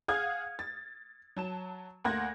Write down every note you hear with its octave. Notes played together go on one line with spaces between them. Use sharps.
G#4 F5 F#5 D#6 F6 G#6
A6
F#3 A5 E7
D2 A#3 F#5 C6 G#6 A#6